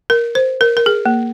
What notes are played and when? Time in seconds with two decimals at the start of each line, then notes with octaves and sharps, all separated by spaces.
0.10 A#4
0.35 C5
0.61 A#4
0.77 A#4
0.86 G#4
1.06 A#3